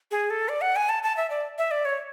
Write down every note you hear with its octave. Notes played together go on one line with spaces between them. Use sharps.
G#4
A4
D5
F#5
G#5
A5
A5
E5
D5
E5
D5
C#5